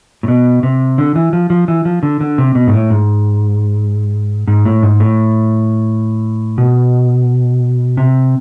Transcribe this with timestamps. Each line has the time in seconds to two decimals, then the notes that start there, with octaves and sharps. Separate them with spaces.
0.23 A2
0.28 B2
0.63 C3
0.98 D3
1.15 E3
1.33 F3
1.50 F3
1.68 E3
1.85 F3
2.03 D3
2.21 D3
2.38 C3
2.55 B2
2.67 G#2
2.73 A2
2.90 G#2
4.47 G#2
4.65 A2
4.83 G#2
5.00 A2
6.58 B2
7.97 C3